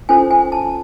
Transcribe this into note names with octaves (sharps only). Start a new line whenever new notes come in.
C#4 F4 A4 C5 G#5
G#5
A5